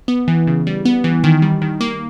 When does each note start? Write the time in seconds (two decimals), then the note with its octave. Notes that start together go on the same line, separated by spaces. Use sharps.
0.08 B3
0.28 E3
0.47 C#3
0.67 G3
0.85 B3
1.04 E3
1.24 D#3
1.42 G3
1.62 D#3
1.81 A#3